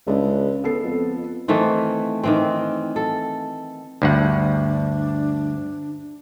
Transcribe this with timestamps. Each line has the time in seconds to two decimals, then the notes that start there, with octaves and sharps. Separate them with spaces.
0.07 C#2 G#3 D4 E4
0.64 B3 A4 C7
0.84 F2
1.48 D#3 E3 A3 C4
2.23 D#3 E3 C4
2.96 A4
4.02 D2 G2 D4 F#5